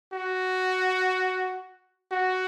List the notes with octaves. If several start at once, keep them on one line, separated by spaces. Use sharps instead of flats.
F#4
F#4